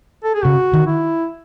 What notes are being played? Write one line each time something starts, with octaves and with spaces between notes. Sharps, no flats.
A4
G#4
C#3 F#4
D#3
E4